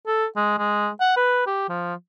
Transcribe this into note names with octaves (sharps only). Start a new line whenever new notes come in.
A4
G#3
G#3
F#5
B4
G4
F3